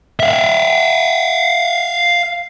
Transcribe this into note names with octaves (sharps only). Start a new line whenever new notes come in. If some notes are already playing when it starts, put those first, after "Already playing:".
E5 F5